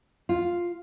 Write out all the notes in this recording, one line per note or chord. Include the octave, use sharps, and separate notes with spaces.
F4